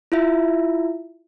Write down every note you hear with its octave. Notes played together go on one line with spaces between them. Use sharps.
E4 F4 E5